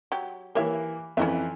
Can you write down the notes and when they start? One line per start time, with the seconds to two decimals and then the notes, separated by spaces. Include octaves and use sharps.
0.12 F#3 G4
0.55 E3 A#3 G4 C#5 E5
1.17 F2 E3 C#4 D#4 E5